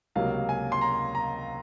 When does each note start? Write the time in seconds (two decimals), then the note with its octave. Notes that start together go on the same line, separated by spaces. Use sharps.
0.15 C#2 C3 F#3 A#3 F5
0.49 G#5
0.72 C6
0.81 A#5
1.15 A#5